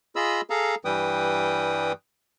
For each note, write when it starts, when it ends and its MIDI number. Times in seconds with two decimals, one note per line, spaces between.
0.16 0.41 65
0.16 0.41 68
0.16 0.41 75
0.16 0.41 83
0.16 0.41 88
0.50 0.75 68
0.50 0.75 69
0.50 0.75 77
0.50 0.75 82
0.85 1.92 43
0.85 1.92 52
0.85 1.92 55
0.85 1.92 71
0.85 1.92 79
0.85 1.92 87